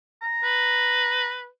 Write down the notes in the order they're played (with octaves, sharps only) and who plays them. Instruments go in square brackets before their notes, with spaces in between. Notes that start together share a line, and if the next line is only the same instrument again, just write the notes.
[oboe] A#5
[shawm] B4